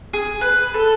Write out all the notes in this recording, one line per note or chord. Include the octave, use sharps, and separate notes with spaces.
G#4
B4
A4